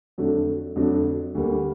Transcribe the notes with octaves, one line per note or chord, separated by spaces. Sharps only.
F2 D3 F#3 A3 D4
F2 D3 F#3 A3 D4
D2 D3 G3 A#3